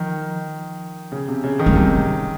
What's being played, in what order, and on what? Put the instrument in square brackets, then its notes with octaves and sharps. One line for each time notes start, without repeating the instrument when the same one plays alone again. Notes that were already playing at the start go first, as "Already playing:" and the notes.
Already playing: [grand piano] D#3 [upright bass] F3
[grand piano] C#3
C3
C#3
D#3
[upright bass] G#3
[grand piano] C3 [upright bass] G3